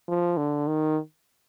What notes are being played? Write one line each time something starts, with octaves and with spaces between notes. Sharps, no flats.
F3
D3
D#3